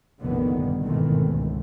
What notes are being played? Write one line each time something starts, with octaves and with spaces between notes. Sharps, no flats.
F1 A#1 A2 D3 D#3 B3
G2
G#1 B2 D#3 E3 A3 C4
C#2